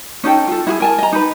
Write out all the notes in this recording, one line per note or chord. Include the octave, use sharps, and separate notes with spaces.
C#4 D#4 A4 G5
F4 A4
E4 F#4 G#4
A#4 G#5 A5
D#5 A#5
D#4 B4